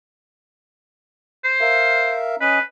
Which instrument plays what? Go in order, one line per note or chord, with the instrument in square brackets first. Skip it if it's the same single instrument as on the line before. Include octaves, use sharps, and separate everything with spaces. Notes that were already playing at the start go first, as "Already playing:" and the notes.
[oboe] C5
[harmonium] A#4 E5 F5
[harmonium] C#4 D#5 [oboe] B4